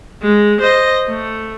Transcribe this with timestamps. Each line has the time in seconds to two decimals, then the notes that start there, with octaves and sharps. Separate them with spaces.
0.22 G#3
0.61 C5 D#5
1.08 A3